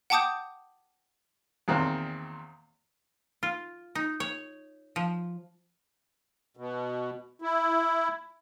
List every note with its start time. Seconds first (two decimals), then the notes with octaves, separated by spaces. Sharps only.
0.10 F#5 G5 A5 D6 D#6 G6
1.68 E2 A#2 D#3 C4
3.43 F4
3.95 D#4
4.20 C#5
4.96 F3
6.57 B2
7.42 E4